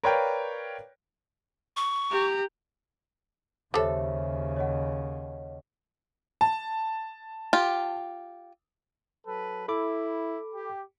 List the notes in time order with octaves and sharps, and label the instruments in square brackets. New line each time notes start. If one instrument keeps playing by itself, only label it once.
[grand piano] A#4 B4 C#5 D5 F5 G5
[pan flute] C#6
[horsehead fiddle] G4 A#5
[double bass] D#2 C#3 [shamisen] G3 A4 [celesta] C5 C#5 E5
[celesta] C#5 D#5 F#5
[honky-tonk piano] A5
[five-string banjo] F4 G4
[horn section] F#3 A4 B4
[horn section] E4 [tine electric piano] A4 B5 D6
[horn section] G4